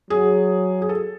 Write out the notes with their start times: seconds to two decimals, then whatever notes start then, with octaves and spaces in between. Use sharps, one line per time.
0.10 F#3 G#4
0.82 G#4
0.89 A4